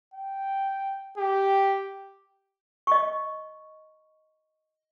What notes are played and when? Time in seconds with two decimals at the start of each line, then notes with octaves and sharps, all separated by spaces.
0.14 G5
1.17 G4
2.87 D#5 C#6